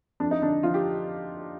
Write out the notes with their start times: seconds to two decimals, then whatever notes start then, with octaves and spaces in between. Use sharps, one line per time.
0.20 F2 D4
0.31 D#4
0.42 D3 D4
0.63 F3 F4
0.74 G4